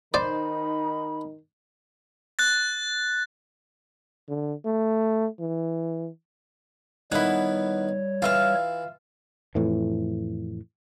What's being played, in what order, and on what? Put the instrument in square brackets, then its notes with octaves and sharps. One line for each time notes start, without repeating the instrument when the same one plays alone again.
[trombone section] D#3 D#4 [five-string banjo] C5 [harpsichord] D5 [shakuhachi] B5
[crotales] F#6 A6
[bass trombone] D3
A3
E3
[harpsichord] D#3 B3 [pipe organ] G3 C#5 [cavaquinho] E4 F#5
[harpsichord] E3 [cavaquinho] F4 E5 F5
[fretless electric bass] F2 A2 E3